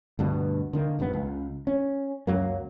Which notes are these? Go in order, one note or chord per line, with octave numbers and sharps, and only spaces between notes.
D2 G2 B2
D3 D#3 A#3
E1 A#1 G2 B3
C#2
C#4
C#2 F#2 F#3 A#3